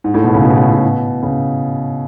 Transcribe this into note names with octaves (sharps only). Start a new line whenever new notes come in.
G#2
A2
B2
C#3
B2
A2
G#2
B2
C#3